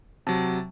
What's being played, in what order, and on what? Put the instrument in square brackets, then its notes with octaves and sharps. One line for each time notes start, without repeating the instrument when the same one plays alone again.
[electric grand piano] C3 F#3 A5